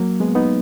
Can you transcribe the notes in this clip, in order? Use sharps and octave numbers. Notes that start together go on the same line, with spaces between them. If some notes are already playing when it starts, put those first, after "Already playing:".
Already playing: F#3 A#3
G#3 B3
B3 D#4